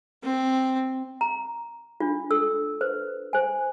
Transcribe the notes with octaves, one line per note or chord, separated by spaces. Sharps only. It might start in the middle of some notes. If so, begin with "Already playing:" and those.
C4
A#5
D4 F4
A4 E6
B4 C5
C5 G#5